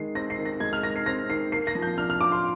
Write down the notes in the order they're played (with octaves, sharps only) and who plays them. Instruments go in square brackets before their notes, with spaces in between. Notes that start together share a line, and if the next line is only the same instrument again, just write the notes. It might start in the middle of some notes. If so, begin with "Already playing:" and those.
Already playing: [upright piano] D#3 G#3 [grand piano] C7
[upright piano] C4 [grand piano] A#6
[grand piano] C7
[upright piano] D#3
[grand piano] A#6
[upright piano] G#3 [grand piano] G#6
[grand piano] F6
[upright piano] D#3 [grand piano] A#6
[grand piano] C7
[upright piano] C4 [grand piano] A#6
[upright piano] D#3 [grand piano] C7
[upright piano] A#3 [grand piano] C7
[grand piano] A#6
[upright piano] F3
[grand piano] G6
[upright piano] D4 [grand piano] F6
[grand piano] F6
[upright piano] F4 [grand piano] D6
[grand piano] C6